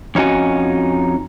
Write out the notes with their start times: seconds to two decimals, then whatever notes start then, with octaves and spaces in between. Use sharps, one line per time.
0.15 F2 C#4 D#4 F#4 G#5